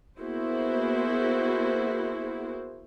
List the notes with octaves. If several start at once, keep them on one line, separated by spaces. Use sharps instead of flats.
A#3 B3 E4 F#4 G#4 C5